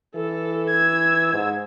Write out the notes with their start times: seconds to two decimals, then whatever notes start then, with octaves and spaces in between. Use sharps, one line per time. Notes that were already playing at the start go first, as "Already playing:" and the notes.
0.16 E3 A4
0.72 E6 G#6
1.33 G#2